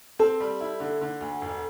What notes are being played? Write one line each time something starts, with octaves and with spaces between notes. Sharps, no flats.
C4 A4
G3
E4
D3
D3
D2
E1